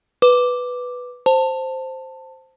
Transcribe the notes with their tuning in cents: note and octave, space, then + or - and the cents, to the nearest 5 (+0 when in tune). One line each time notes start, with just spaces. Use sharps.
B4 +0 D6 +0
C5 +0 A5 +15